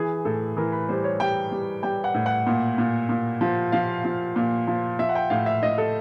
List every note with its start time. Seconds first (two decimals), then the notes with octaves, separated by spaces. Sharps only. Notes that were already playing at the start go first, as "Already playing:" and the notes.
Already playing: E3 G#4
0.25 A2 A4
0.57 E3 A#4
0.72 B4
0.89 G3 C5
1.04 C#5
1.20 G3 G5
1.52 G3
1.83 G3 G5
2.04 F#5
2.14 A2
2.26 F#5
2.47 A#2
2.78 A#2
3.09 A#2
3.41 F3
3.72 F3 F5
4.05 F3
4.36 A#2
4.67 F3
4.99 F3 E5
5.09 F#5
5.15 G5
5.30 A2 F5
5.46 E5
5.62 A2 D#5
5.78 A4